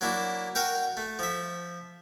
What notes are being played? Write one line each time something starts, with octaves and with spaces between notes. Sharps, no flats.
F#3 A#3 D4 E4
F#4 A#4 F5 G5
A3
F3 E5